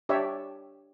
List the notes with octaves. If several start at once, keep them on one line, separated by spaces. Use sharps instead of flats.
D4 G4 C#5 D5 E5